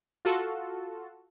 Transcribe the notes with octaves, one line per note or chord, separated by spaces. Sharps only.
F4 F#4 A4